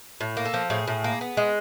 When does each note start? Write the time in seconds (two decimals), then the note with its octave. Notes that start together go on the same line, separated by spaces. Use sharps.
0.20 A2
0.37 A#3
0.45 A4
0.54 F3
0.70 A2 G#4
0.87 A2
1.04 A#3
1.21 B3
1.37 G#3